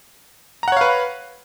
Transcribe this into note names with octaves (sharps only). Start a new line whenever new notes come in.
B4 C#5 F5 F#5 A#5